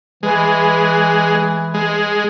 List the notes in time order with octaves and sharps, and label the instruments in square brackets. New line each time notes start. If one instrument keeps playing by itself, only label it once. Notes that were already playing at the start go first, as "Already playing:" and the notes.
[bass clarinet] E3 [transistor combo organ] G#3
[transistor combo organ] G#3